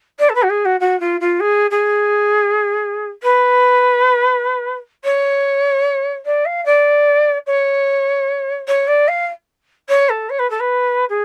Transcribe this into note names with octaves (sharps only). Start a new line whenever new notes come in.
D5
A4
B4
F#4
G#4
F#4
F#4
F4
F4
G#4
G#4
B4
C#5
D5
F5
D5
C#5
C#5
D5
F5
C#5
A4
C#5
B4
A4
B4
G#4